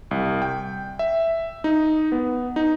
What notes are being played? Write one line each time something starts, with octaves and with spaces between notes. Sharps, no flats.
C2
G5
E5
D#4
B3
D#4